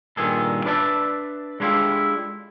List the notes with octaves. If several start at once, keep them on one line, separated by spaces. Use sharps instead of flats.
G2 A#2 D#3 G#4 A4
D4 B4 D5 E5 A5
G#3 D4 E4 F4 G4 A4